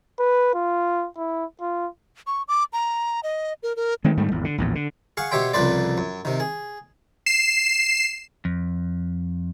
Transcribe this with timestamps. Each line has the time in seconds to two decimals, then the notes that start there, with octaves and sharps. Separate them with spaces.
0.19 B4
0.54 F4
1.17 E4
1.61 F4
2.27 C#6
2.48 D6
2.73 A#5
3.23 D#5
3.63 A#4
3.76 A#4
4.04 D#3 G#3 A3 C4
4.17 G#2 D#3 G3 A3
4.31 G#1 E2
4.44 D3
4.58 A#1 E2 A2
4.75 D3
5.17 G#4 F5 F#5 C#6
5.31 B2 G4 C#5 E5 G5 C6
5.53 C2 F2 C#3 B4 C5 D5
5.98 F#2
6.25 C3 D#3
6.40 G#4
7.26 C7 E7
8.45 F2